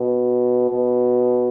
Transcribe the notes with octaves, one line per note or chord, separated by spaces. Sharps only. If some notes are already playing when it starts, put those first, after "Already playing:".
Already playing: B2
B2